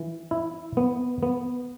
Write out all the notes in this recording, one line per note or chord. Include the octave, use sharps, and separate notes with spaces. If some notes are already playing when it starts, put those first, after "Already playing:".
Already playing: E3
E4
B3
B3